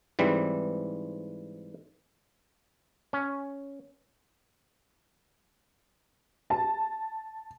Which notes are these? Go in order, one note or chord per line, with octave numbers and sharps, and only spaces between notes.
G#2 E3 G3 C4
C#4
A5